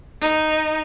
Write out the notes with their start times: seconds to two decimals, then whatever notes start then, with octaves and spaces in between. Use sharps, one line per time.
0.21 D#4